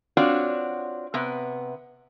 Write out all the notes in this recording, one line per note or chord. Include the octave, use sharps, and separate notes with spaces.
C4 D4 F4 F#4 C#5 D5
C3 B3